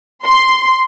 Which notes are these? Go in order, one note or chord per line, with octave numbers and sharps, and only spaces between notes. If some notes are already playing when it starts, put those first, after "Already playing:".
C6